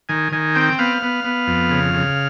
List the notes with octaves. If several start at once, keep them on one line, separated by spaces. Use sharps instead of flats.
D#3 G#5
D#3 G#5
C4 G5
B3 F5
B3
B3
F2
C#3
C#3